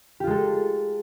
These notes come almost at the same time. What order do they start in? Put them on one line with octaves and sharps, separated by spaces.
G4 F4 G#3 A4